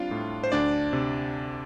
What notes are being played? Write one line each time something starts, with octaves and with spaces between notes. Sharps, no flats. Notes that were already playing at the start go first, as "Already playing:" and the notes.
Already playing: G3 C4 D4 F4 F5
A2
C5
D2 D4 D5
C3